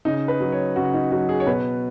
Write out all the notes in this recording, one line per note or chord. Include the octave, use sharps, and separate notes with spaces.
C#3 D#4
B4
F#3
C#5
C#3 F#4
D#4
F#3 F#4
G#4
C#5
B2 B4